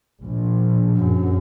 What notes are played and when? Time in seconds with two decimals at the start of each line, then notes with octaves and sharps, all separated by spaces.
0.20 A#1
0.97 F#2